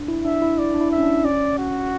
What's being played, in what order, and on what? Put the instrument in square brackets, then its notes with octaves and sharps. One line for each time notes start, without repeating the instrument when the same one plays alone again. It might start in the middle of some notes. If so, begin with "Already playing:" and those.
Already playing: [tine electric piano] D4
E4
[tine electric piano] D4 [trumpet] E5
[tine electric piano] E4
[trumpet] D5
[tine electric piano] D4
E4
[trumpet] E5
[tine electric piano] C#4
D4
[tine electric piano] C#4 [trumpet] D5
[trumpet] F#4